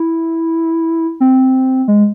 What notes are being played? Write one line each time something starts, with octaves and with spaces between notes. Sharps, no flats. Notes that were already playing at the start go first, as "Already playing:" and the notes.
Already playing: E4
C4
G#3